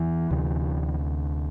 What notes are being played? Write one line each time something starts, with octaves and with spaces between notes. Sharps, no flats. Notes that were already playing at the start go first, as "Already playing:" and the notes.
Already playing: E2 E3
D2 C3